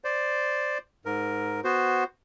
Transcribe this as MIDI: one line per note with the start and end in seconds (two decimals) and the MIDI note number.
0.04 0.78 72
0.04 0.78 74
1.06 1.61 44
1.06 1.61 70
1.64 2.04 59
1.64 2.04 66
1.64 2.04 72